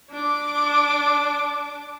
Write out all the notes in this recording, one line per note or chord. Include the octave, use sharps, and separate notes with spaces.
D4 D6